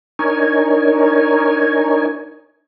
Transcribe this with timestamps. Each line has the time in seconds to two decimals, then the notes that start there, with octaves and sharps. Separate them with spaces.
0.19 D4 D#4 A#4 C#5 G#5